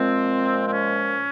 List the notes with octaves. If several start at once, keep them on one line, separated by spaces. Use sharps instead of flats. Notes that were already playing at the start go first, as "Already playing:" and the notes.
Already playing: A#2 F3 G#3 C4
C4
C#4